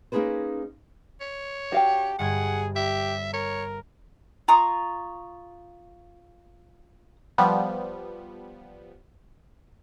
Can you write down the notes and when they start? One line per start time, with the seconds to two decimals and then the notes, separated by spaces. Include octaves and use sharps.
0.12 A#3 C#4 D#4 G#4 B4 C5
1.21 C#5
1.72 D4 F#4 G4 F5 G5
2.19 G1 G2 G#4 F#5 G#6
2.76 G4 E5
3.33 A#4 C#5
4.48 F4 A#5 C#6 D#6
7.38 F3 G3 B3